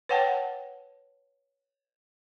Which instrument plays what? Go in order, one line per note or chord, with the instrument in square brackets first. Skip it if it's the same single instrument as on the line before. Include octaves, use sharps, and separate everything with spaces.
[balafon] B4 C#5 F#5 G5 A5